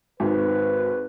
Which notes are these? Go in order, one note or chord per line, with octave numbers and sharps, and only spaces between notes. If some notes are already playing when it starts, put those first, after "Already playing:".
G#1 B4